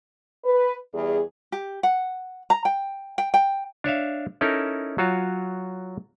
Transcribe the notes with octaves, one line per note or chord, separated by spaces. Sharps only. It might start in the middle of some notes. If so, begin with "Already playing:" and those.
B4
E2 G3 G#4
G4
F#5
A#5
G5
G5
G5
D4 C#5 E5 F5
C#4 D#4 E4 A4 A#4
F#3 F4 F#4 C#5